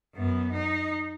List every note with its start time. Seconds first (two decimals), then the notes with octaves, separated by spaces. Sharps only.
0.14 F#2 B3
0.52 D#4